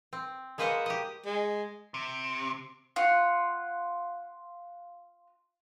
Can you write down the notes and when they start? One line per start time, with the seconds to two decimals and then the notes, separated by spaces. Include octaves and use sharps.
0.13 C4
0.58 G#3 A#3 B4 C5 D#5 F#5
0.86 G4 D#5
1.26 G#3
1.94 C3
2.96 F4 F#5